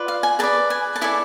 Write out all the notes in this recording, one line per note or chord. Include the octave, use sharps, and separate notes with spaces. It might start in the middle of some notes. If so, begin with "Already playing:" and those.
Already playing: F4 B4 D5
F5
G#5
G#4 B4 D5 A5
G#5
A5
E4 A4 D5 G#5